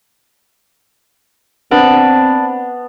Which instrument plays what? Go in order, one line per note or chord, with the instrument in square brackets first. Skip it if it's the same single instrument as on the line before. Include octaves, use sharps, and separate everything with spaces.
[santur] B3 [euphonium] C4 [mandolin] D4